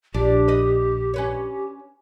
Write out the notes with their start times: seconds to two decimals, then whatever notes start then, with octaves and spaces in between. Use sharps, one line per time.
0.14 A#1 D4 G4
0.48 B4 D#5
1.14 C#4 B4 C#5